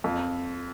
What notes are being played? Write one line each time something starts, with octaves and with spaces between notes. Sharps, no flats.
F2